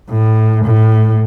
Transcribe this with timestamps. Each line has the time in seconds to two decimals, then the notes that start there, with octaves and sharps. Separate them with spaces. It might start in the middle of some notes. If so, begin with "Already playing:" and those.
0.10 A2
0.65 A2